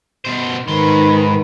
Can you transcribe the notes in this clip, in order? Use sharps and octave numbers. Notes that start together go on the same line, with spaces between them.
B2 C5
G#2 D#3 B4 C6